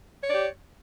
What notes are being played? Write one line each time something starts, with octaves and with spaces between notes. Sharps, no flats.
G4 C#5 D5